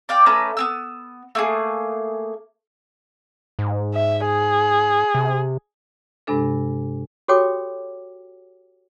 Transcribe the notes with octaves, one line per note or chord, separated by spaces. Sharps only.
D5 F5 G5
A3 C#4 B4 A#5
B3 C4 E6
A3 A#3 G#4
G#2
E5
G#4
C3
G2 C3 G#3 D4 A4
F#4 G4 A4 C#5 G5 D6